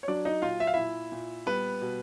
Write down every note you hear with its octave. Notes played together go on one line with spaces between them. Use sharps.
C#5
F#3 D4 D5
D#4 D#5
A#2 F4 F5
E5
F5
A#2 E4 E5
A#2
G3 B3 B4
B2